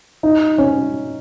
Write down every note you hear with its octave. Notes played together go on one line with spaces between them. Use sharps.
D#4
C#4